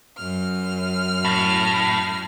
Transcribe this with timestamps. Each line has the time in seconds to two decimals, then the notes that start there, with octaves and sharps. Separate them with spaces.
0.16 F#2 F6
1.25 A2